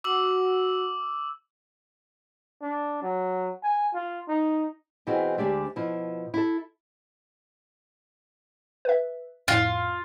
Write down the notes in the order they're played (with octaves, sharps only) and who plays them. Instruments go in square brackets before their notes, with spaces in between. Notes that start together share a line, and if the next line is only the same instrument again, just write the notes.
[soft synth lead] F#4 [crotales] D6 E6 F#7
[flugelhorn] D4
F#3
G#5
F4
D#4
[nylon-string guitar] B2 E3 C4 E4 F#4 G#4
D2 G#3 D4 G4 D5 E5
B2 F3 E4 F4
E4 A4
[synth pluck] B4 E5
[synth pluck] F2 A2 [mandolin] F4